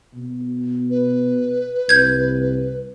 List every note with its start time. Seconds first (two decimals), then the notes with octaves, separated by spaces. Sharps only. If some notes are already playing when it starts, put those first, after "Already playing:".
0.14 B2
0.90 B4
1.89 C2 G6 G#6